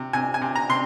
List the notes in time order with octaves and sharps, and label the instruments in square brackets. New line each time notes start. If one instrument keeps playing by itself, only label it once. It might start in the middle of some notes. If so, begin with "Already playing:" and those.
Already playing: [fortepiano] C3
C3 G#5
G#5
C3
A#5
C3 C6